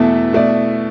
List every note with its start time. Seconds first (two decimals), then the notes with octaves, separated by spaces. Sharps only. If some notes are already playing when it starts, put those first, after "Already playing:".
Already playing: E2 B2 A3 E4 A4
0.33 B2 A3 E4 D5